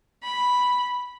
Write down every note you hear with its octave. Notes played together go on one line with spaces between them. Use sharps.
B5